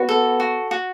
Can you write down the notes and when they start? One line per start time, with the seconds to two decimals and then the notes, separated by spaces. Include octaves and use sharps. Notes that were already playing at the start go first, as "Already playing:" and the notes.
Already playing: B3 F#4
0.09 A4
0.40 F#4
0.71 F#4